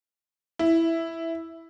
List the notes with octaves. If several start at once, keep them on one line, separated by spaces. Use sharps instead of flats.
E4